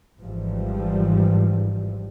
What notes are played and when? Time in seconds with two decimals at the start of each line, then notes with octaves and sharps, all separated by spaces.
0.20 G#1 G#2 E3 F3 G3